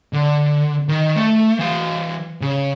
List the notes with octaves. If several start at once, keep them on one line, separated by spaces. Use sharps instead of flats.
D3
D#3
A3
E3 F5
C#3